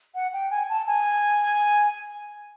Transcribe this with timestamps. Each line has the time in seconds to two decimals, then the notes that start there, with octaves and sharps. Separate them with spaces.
0.15 F#5
0.33 G5
0.51 G#5
0.69 A5
0.87 G#5